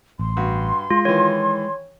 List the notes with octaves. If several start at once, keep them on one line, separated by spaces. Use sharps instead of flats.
A1 C6
G2 F#4
G#3 F4
D#3 E3 C#5